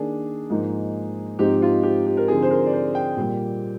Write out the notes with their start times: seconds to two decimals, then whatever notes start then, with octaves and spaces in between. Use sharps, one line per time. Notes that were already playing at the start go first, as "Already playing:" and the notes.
Already playing: D#3 A#3 D4 G#4
0.50 G#2 F3 A#3 D#4
1.39 G#2 F3 C4 D#4 G4
1.62 F4
1.83 G4
2.07 G4
2.17 A#4
2.28 D3 F3 C4 D#4 G#4
2.43 C5
2.50 A#4
2.66 D5
2.73 C5
2.95 G5
3.17 A#2 G3 A#3